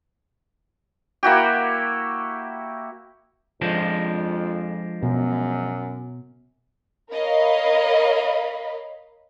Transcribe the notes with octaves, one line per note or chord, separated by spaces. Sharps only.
A#3 E4 F#4 G4
F2 F3 G#3 D4
F#2 B2
A#4 C#5 D#5 F5 B5